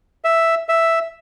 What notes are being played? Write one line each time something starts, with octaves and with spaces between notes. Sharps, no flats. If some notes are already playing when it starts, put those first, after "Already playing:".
E5
E5